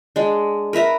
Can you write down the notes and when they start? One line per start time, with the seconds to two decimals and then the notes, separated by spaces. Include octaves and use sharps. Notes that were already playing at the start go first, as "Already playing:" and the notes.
0.16 G#3 D4
0.73 A#4 B4 E5 A#5